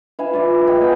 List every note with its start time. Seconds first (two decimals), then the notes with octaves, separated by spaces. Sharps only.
0.19 B4 E5 F5 G#5
0.33 F4 D5 E5
0.67 D#4 G#4 G5 G#5
0.81 B3 D5 G5